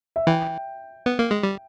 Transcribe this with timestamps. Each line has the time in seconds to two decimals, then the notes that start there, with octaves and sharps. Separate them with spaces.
0.16 E5
0.27 E3 G5
1.06 B3
1.19 A#3
1.31 G#3
1.43 G3